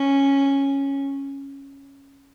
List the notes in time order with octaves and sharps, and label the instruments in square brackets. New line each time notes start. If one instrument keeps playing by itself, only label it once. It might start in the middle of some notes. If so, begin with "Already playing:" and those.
Already playing: [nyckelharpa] C#4